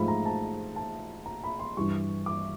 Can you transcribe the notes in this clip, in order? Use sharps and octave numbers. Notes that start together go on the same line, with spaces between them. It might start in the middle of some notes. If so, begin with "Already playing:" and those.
Already playing: G#2 F3 A3 B5
A#5
A5
A5
A#5
B5
C6
G2 E3 G3 C#6
D6